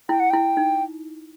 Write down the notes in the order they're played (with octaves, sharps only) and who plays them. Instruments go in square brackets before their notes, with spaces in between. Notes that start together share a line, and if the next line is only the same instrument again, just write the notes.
[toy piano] E4 [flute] G5
[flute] F#5
[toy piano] E4 [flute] G5
[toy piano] D#4